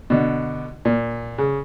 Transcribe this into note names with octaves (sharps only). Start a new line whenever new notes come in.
B2 D3
A#2
C#3